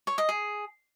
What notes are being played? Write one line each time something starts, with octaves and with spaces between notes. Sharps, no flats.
C#5
D#5
G#4